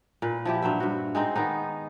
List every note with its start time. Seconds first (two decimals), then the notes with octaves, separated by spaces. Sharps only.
0.22 A#2 B4
0.45 F3 E4 G4
0.62 G2 F#3 C5 E5
0.80 G2 F#4
1.15 G#3 C4 D#4
1.35 D#3 B3 D#4